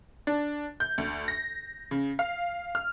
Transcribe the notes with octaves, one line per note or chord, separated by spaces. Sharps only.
D4
G6
D2
A#6
C#3
F5
F6